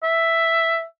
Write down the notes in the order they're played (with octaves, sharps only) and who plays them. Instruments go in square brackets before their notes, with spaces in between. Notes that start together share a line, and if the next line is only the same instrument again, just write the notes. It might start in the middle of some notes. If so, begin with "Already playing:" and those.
[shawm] E5